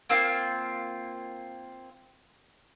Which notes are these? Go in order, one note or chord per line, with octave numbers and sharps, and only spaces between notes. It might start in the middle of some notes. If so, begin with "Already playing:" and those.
A#3 C4 F4